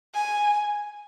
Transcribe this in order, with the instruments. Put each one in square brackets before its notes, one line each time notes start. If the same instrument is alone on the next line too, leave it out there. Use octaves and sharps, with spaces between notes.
[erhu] G#5